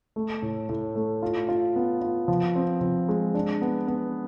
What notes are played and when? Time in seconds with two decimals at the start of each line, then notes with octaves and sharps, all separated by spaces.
0.16 A3
0.42 A2
0.69 A2
0.95 A3
1.23 F4
1.49 F4
1.76 B3
2.02 F4
2.28 F3
2.55 C4
2.81 F3
3.08 G#3
3.34 D4
3.62 B3
3.88 B3